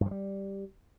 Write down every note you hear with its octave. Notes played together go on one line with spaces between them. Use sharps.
G2
F3
G3